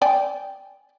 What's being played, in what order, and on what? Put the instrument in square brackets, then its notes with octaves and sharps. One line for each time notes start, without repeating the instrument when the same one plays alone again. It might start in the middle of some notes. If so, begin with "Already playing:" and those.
[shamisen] D5 G5 G#5